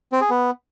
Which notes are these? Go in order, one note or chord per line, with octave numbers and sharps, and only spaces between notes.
C4
G#4
B3